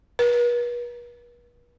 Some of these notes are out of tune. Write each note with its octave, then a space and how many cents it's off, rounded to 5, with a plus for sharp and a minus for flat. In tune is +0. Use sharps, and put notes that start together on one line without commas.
B4 -40